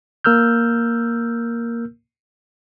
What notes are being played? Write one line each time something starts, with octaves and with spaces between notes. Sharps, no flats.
A#3 A#4 E6 F6 G6